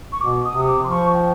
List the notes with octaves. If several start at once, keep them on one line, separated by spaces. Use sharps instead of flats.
C#6
B2 D6
D#6
C3
D6
F3 C6
C#6
G5